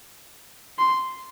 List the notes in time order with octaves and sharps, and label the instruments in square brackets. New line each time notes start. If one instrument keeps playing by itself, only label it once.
[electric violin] C6